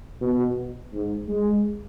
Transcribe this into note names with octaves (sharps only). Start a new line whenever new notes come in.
B2
G#2
G#3